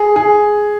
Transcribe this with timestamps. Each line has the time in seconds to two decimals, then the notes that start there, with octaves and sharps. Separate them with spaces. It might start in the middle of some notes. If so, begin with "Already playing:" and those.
Already playing: G#4
0.16 G#4